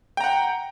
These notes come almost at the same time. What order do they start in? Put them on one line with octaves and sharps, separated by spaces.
G5 A#5 F#5